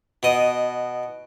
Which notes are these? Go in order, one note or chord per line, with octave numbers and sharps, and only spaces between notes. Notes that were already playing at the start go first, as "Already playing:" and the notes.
B2 D#5